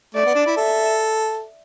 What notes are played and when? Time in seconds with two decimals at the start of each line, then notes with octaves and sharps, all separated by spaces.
0.15 A3 D5
0.26 B3
0.35 D4
0.46 E4
0.56 A4 E5